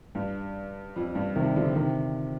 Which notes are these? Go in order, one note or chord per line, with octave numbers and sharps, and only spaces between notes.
G2
F2
G2
C3 D#3
D3 F3
C3 D#3